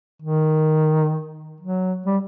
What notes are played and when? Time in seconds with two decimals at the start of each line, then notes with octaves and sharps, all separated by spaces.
0.22 D#3
1.60 F#3
2.06 G3